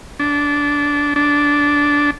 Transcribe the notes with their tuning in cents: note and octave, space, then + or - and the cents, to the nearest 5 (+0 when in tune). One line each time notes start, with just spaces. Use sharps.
D4 -20
D4 -15